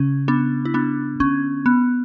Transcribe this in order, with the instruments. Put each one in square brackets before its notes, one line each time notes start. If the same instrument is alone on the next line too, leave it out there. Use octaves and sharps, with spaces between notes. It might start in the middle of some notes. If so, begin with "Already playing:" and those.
Already playing: [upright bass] C#3 [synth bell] C#4
[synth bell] B3 D4
E4
B3 D4
[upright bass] D3 [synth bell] C#4
[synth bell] B3